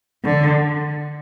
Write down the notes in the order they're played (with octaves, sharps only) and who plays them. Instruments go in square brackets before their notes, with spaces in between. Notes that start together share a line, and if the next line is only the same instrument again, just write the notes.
[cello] D3